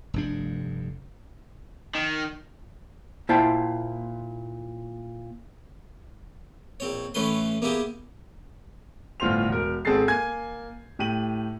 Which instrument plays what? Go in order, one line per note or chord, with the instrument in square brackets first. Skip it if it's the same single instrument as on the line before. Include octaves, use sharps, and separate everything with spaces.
[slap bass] F1 G2 D4
[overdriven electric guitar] D#3
[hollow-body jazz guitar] A#2 E4 C5 E5 G5 A5
[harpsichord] A#1 C4 C#5
A2 E3 A3 C#4 B4 C6
A#3 B3 E4 G4 G#4
[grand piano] G1 A2 F4 C5 C6 F7
E1 A#4
G#1 C4 G#4 A4 A6 C7
A#3 G#5 G#6
A2 G4 D#7 F#7